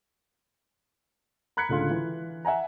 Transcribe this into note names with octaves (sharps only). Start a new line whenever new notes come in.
A#5 B5 F#6 G#6 B6 C#7
C#2 A2 D3 F4
E3
E5 F#5 G#5 A#5